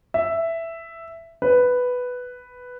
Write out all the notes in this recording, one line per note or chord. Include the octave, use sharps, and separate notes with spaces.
E5
B4